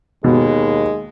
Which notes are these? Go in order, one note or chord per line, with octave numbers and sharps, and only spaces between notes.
D#2 B2 G#3